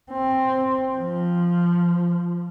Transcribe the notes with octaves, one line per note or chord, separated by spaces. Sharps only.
C4
F3